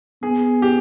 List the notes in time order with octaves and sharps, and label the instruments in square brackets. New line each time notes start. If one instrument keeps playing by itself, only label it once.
[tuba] B3 [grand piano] G#4
[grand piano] G4